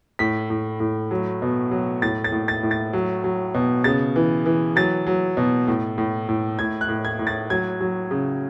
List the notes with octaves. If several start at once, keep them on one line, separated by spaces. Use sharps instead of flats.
A2 B6
A2
A2
F#3
B2
F#3
A2 A6
A6
A2
A6
A2
A6
F#3
F#3
B2
C#3 A6
E3
E3
F#3 A6
F#3
B2
A2
A2
A2
A2 G#6
F#6
A2
G#6
A2
A6
F#3 G#6
F#3
C#3